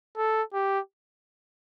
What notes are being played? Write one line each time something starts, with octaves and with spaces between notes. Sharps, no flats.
A4
G4